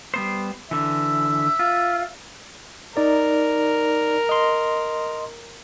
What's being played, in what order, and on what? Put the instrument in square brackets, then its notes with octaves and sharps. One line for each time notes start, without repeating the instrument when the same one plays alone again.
[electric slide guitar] G3 B3 C5
[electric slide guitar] D3 E3 [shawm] E5
[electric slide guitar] F4
[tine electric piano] D#4 D5 [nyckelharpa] A#4
[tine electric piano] D#5 C6